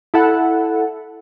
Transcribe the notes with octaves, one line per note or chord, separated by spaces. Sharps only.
E4 A4 F#5